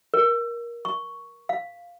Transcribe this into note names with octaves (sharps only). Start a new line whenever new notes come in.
A#4
C#6
F5